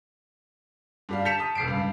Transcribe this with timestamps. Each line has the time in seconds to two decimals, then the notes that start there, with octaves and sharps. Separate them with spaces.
1.09 G2 G3 F5
1.25 A5 G6 B6 C#7 E7 F7
1.39 A5 D#6
1.55 E1 C7 D7
1.68 C#2 G2